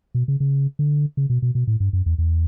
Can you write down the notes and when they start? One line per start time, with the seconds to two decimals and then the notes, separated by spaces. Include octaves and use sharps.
0.15 B2
0.28 C#3
0.40 C#3
0.79 D3
1.17 C#3
1.30 B2
1.42 B2
1.55 B2
1.67 A2
1.80 G2
1.93 F#2
2.06 E2
2.18 E2